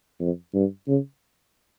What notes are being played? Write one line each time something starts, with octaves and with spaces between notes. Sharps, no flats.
F2
G2
C#3